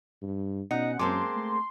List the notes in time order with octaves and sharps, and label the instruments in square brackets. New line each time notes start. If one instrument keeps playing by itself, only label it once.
[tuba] G2
[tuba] B2 [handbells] C#4 C#7 [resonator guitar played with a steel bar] D#4 [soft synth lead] F#5
[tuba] F#2 [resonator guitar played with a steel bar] G#3 A#3 C4 [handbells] A5 D6 [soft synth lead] C6
[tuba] A3